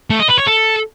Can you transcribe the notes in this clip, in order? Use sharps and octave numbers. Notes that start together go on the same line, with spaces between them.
A3
D#5
B4
C#5
A4